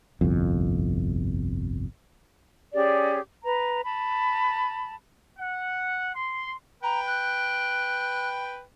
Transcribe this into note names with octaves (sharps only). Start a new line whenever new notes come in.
G1 C2 F2
C#4 G4 G#4 D5
B4 A#5
A5 B5
F#5
C6
B4 G5 A#5
F#6